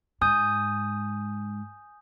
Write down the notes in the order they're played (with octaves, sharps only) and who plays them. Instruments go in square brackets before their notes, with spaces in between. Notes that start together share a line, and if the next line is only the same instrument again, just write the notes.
[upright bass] G#2 [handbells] G#5 D#6 G6